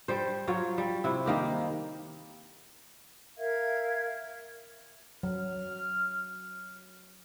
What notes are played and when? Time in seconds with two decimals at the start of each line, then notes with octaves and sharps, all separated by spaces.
0.08 G3 C5
0.48 F#3 F4 C#5
0.78 G3
1.04 C3 E4
1.26 D#3 A#3 G4
3.37 A#4 E5 F5 G#6
5.23 F#3 F6